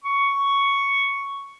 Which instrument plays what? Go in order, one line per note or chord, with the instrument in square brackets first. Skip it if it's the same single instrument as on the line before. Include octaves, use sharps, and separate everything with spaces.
[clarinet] C#6